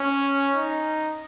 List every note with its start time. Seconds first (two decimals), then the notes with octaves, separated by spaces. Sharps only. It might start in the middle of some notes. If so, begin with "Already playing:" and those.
Already playing: C#4
0.55 D#4